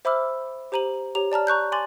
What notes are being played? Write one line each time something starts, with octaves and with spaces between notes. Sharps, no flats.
C5 E5 B5 D6 E6 F6
G4 C5 A#5 D#7 F#7
G4 C#5 A#5 F7
D5 A5 A#5 F6
A#5 C#6 F#6 G6
G#5 C6 D6 A6 F#7